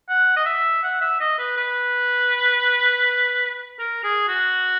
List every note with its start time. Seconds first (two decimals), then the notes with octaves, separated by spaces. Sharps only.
0.09 F#5
0.36 D#5
0.46 E5
0.83 F#5
1.01 E5
1.20 D#5
1.38 B4
1.57 B4
3.79 A#4
4.04 G#4
4.28 F#4